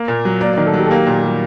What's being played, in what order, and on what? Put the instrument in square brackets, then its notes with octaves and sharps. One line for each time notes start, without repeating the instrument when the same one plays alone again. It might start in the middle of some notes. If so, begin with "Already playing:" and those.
Already playing: [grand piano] A#3
A#2
F#3
[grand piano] A#3 [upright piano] D5
[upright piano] D5
[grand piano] D#3
[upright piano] A4
[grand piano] F#3
[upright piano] G4
A4
[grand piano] A#3 [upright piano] G4
[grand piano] A#2
G3